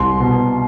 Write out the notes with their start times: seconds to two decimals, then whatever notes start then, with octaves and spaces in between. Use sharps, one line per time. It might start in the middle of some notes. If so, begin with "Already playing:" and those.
Already playing: C2 C6
0.20 B2